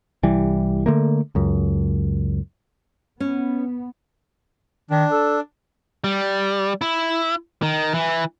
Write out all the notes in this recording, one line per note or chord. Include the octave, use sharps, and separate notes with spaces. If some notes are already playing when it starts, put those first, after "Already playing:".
C2 E3 G3
D3 A3 A#3
C#2 F#2
B3 C#4
D#3 D4
A4
G3
E4
D#3
E3